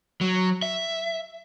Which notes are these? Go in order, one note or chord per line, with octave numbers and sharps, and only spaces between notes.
F#3
E5